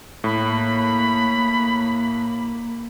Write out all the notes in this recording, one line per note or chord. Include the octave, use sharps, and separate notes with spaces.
A2 A#3 B5